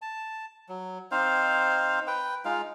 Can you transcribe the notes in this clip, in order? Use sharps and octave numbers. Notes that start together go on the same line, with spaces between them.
A5
F#3
C4 D#4 C5 F5
B4 G5
G#3 D#4 F4 F5